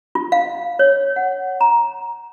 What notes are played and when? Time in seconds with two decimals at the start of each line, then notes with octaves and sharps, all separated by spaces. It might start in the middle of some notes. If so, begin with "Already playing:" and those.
0.15 F4
0.32 F5
0.79 C#5
1.16 F#5
1.61 A#5